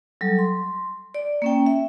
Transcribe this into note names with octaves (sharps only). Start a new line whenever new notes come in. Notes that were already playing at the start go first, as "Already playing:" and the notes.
F#3 G3 A4
C6
D5
A#3 C#4 G5
E5